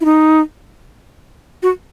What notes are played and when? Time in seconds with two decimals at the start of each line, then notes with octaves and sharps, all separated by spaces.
0.01 E4
0.05 D#4
1.63 F#4